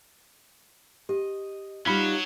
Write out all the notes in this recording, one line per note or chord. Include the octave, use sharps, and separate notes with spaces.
G4 D#5
F#3 G3 D#4 F4 F#4 B5 F6 B6
E7